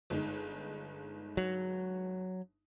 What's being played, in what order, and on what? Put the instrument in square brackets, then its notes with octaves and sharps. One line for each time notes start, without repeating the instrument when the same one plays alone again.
[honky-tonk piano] G1 G#3 D#4
[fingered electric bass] F#3